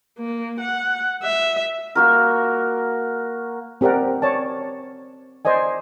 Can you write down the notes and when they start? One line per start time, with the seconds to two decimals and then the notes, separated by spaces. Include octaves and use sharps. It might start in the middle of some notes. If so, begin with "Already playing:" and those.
0.18 A#3
0.60 F#5
1.23 E5
1.95 A#3 F#4 A#4
3.81 C4 G4 A#4 D5 F#5
4.22 C#5 D5 A5
5.45 C5 D5 D#5 G#5